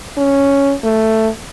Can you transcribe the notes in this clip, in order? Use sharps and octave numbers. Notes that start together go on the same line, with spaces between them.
C#4
A3